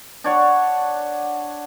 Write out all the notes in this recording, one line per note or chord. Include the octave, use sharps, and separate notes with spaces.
D4 C#5 F#5